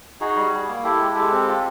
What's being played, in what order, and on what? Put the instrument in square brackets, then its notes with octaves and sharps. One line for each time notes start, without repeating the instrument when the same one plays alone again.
[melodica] D#4 F#4 G#4
G3
G3
A#3
E4 G4 A4
G#3
G#3 G4 A4
C4
F4